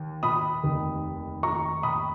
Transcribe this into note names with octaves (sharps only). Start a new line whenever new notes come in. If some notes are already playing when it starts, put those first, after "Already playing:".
Already playing: D#2
B5 D#6
F1 D#2 D#3
A#5 C#6
B5 D#6